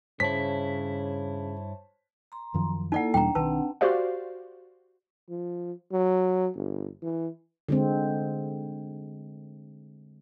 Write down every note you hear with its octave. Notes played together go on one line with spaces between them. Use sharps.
G2 C#3 E4 C5 C#5 A5 B6
A#5 C6
F#2 D#3 F3
A#3 D#4 E4 A4 D5 F#5
E2 B2 G3 D4 G5 A#5
B1 D#3 C4 D4 B4 F#5 A5
F#4 G4 C5 D5 F5
F3
F#3
G1
E3
D3 G#3 C4